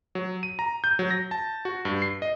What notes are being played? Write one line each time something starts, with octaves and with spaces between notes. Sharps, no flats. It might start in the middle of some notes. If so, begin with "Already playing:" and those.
F#3
D#7
A#5
G6
F#3
A#6
A5
F#4
G2
C7
D#5